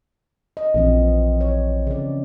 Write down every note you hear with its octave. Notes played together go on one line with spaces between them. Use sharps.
D#5
A#1 E3 F3 C4
C#5
C#3 D5